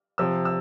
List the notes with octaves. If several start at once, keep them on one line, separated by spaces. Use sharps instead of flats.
C3 F3 E6
E6